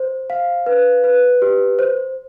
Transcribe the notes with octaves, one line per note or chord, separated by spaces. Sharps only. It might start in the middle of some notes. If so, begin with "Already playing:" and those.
Already playing: C5
F5
B4
B4
G4
C5